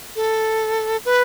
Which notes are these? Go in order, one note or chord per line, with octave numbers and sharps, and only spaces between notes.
A4
B4